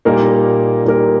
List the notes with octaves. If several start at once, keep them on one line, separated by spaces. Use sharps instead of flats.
A#2 G3 A#3 D#4 A#4
A#2 G3 A#3 D#4 A#4